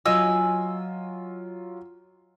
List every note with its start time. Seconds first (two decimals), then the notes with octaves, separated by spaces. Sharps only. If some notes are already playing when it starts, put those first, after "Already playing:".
0.06 F#3 F4 D#5 G#5 E6